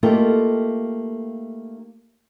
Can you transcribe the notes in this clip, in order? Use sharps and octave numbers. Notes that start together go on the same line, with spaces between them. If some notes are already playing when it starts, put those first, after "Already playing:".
A3 A#3 D#4 F4 G4 A4